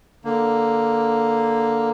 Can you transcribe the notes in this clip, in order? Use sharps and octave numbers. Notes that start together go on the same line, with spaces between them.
D3 A#3